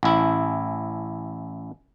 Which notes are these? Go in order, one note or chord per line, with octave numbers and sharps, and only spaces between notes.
A1 E4